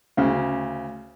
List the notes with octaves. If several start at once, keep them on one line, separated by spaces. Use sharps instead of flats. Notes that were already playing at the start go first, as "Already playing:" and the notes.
D2 C#3